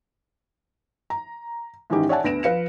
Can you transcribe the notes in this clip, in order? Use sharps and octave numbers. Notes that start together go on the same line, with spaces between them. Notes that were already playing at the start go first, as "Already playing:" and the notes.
A#5
G#2 D#3 E3 C#4 D#4 G4
C#5 D5 E5 F#5 G#5 A5
D2 B3 A#6 D7 E7
F3 B4 F5 C#7 E7